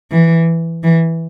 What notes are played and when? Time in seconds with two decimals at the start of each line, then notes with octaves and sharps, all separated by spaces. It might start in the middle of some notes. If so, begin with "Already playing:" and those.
0.11 E3
0.83 E3